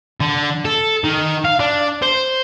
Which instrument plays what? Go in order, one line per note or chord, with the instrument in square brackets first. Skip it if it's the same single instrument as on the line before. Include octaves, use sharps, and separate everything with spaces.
[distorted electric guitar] D3
A4
D#3
F5
D4
C5